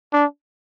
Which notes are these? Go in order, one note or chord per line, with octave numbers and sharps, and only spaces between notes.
D4